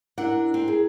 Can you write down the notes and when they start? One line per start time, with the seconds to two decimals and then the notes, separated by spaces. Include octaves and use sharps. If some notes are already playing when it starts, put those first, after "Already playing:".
0.18 D4 E4 A#4 F#5
0.54 C4
0.68 G#4